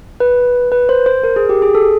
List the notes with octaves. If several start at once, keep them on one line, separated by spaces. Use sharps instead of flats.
B4
B4
C5
C5
A#4
G#4
G4
G#4
A4